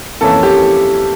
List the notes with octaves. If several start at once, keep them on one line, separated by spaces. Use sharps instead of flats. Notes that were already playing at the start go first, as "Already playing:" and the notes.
F2 E3 A#3 C#4 A4
G4